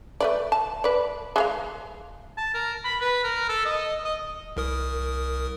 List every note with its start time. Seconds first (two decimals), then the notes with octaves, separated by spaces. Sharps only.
0.20 A3 B4 D5
0.52 A5
0.84 B4 D5
1.36 G#3 A4 F5
2.37 A5
2.54 A#4
2.84 B5
3.01 B4
3.24 A#4
3.49 A4
3.66 D#5
4.04 D#5
4.57 C2 A#4 D#6